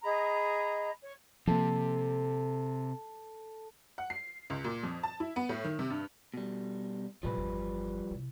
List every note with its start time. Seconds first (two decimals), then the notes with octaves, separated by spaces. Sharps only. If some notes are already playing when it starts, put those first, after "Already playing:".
0.03 G#4 D#5 A#5 B5
1.00 C#5
1.47 C3 F3 A#3 A4
3.98 F#5
4.10 C7
4.50 C#2
4.64 A#2
4.83 F2
5.03 A5
5.20 E4
5.36 B3
5.49 A2
5.64 D#3
5.79 C3
5.90 G2
6.34 B2 G3
7.23 B1 A2 F3 G3 B4
7.37 G1 E2
8.11 C3 E4